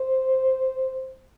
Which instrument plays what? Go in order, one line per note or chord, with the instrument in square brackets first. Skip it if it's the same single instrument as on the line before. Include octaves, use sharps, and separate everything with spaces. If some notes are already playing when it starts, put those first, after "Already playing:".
Already playing: [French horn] C5